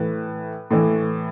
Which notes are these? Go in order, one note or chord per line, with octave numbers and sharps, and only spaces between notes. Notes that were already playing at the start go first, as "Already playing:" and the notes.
Already playing: A2 E3 B4
A2 E3